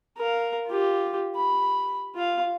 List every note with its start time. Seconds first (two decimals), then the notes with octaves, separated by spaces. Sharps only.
0.18 A#4 F5
0.67 F4 G4
1.36 B5
2.15 F4 F5